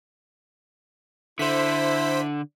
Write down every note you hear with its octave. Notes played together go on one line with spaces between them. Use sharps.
D3 E4 C5 B6